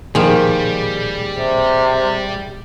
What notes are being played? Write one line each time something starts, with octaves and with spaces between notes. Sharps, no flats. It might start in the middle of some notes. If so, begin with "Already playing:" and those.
A#2 D#3 F3 G3 G#4
C3